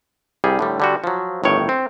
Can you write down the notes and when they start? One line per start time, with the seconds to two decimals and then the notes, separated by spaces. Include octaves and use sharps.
0.44 C2 G3 G#4
0.59 A2 D3 G3
0.80 D3 G3 F#4
1.04 F3 F#3
1.44 G1 A2 D#3 C#5 G5
1.69 C4